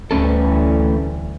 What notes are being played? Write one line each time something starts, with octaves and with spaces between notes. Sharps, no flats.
D2 E3 G3 A3 C#4 A4